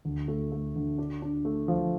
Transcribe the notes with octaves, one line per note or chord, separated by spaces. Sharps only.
D2
A3
A3
D2
D4
D4
A3
F3